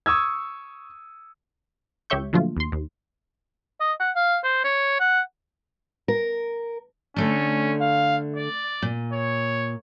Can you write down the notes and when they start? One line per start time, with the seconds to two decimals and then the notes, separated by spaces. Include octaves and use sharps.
0.06 C#6 D#6 E6 G#6
2.10 C#2 G4 C#5 E5 C#6 G6
2.33 A#2 D3 F3 F#3 A3 F4
2.57 D#2 C6
2.72 D#2
3.81 D#5
4.00 F#5
4.16 F5
4.44 C5
4.64 C#5
5.00 F#5
6.08 A#4
7.16 D3 A3 C#4 D4
7.81 F5
8.36 D5
8.82 A#2
9.13 C#5